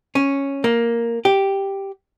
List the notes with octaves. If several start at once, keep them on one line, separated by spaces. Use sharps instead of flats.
C#4
A#3
G4